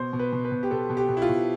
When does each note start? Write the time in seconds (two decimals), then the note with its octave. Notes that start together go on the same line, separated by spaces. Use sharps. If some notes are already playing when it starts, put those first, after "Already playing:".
Already playing: B2 C5
0.13 B2
0.19 B4
0.33 B2
0.45 B4
0.52 B2
0.63 G4
0.71 B2 A4
0.90 B2
0.97 G4
1.09 B2
1.17 E4
1.22 F4
1.29 B2